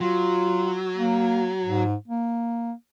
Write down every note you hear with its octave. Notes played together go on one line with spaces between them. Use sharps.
F#3 F4
A#3
G#2
A#3